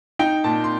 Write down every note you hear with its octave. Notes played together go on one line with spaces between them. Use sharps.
D#4 G5
A#2 A5
C6